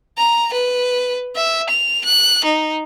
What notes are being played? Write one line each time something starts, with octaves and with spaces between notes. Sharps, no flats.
A#5
B4
E5
F7
F#6
D#4